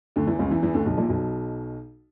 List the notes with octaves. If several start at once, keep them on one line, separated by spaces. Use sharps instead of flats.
D2 D3
E2 E3
C#2 C#3
E2 E3
E2 E3
D2 D3
B1 B2
A#1 A#2
B1 B2